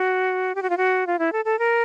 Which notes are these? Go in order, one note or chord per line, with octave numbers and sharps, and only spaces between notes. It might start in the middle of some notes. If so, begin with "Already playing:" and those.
Already playing: F#4
G4
F#4
F4
F#4
F4
E4
A4
A4
A#4